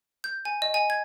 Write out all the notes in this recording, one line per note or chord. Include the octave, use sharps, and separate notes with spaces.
G6
G#5
D#5
G#5
G#6